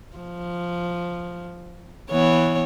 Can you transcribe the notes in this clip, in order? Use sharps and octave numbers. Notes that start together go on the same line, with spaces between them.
F3
E3 B3 C#5